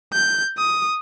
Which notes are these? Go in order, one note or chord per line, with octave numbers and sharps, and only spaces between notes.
G6
D#6